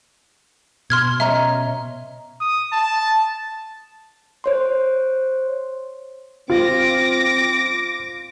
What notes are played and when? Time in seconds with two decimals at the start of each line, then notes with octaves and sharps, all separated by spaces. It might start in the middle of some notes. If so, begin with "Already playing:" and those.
0.90 B2 C6 F6 G#6
1.20 C#4 D#5 E5 A#5
2.41 D#6
2.72 A5
4.44 C5 C#5 C6
6.50 C4 F4 D6 A#6